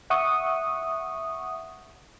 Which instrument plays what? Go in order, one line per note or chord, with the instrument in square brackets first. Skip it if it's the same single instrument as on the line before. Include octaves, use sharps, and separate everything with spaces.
[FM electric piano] E5 F#5 C#6 D#6